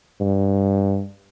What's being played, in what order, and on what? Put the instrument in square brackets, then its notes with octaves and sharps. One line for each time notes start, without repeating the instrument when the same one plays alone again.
[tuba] G2